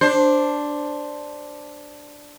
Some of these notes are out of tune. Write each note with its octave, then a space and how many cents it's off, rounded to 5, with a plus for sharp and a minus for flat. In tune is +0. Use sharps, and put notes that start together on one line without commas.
D4 +0 C5 +5